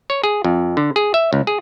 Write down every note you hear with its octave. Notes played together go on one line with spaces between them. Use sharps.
C#5
G#4
F2
D3
G#4
E5
C#2
G#4